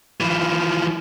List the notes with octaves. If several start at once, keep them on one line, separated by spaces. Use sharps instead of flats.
E3 F3